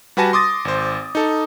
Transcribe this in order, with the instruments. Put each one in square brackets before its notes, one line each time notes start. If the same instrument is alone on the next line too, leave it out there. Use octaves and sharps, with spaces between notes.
[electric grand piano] G3 F#4 B4 G#5 A5 A#6
C6 D6 D#6 A6 A#6
G#1 C5
D#4 A4